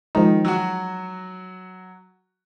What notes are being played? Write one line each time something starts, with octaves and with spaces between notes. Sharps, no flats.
D#3 F3 G#3 D#4
F#3 F#4